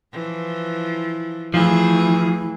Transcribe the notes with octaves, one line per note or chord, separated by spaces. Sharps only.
E3 F3
E3 F3 A3 G#4